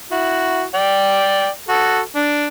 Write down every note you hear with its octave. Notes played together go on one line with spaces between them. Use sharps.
E4 F#4
D5 G5
F#4 A4
D4